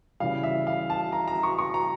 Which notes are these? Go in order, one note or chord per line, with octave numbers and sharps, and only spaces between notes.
C#3 E3 G3 F5
E5
F5
A5
A#5
A#5
C#6
C#6
A#5